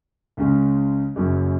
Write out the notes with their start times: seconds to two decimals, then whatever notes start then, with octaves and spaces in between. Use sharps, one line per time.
0.37 C#2 C#3 G#3 C#4
1.16 F#1 F#2 F#3 C#4